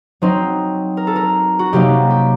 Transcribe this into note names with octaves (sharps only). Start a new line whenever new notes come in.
F#3 C4 D#4 C5
A#4
A4
A#4
F#4
C3 F#3 A#3 D#4 G4
G4